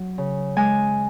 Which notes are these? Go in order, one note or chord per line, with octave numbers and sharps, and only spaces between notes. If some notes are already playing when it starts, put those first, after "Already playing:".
Already playing: F#3
C#3
G#3 G#5